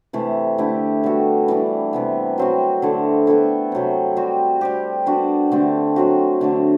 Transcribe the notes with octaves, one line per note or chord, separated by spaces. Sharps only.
C3 E3 A3
D3 A3 E4 G4
G3 B3 F#4 A4
E3 G3 D4
C3 E3 B3
F#3 C4 F#4
D3 A3 E4 A4
G3 B3 E4 A4
C3 F#3 C4
G3 C4 F#4
G3 C4 G4
G3 B3 D4 F#4
D3 A3 C4 G4
F#3 C4 F#4
D3 A3 D4